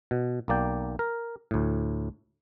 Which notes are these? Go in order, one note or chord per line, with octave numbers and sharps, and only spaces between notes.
B2
B1 A#3 D5 G5
A#4
D2 A2